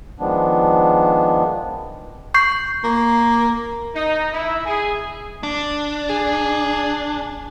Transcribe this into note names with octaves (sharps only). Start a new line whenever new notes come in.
D#3 F3 G#3 B3 D4
C#6 G6 C7
A#3
D#4
E4
G#4
D4
G#4